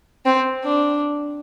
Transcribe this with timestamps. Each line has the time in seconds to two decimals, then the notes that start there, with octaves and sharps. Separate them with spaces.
0.26 C4
0.65 D4